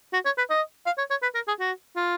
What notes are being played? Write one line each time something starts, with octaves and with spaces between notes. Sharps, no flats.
F#4
C#5
B4
D#5
F5
C#5
C#5
B4
A#4
G#4
F#4
F4